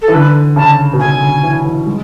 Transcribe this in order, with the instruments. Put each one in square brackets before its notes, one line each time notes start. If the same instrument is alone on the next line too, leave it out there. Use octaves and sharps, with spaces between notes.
[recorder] A4
[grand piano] E3
[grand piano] D3 [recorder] B4
[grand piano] C#3 [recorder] A5
[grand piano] B2
[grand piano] C#3 [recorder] G#5
[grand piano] D3
E3
E3
G#3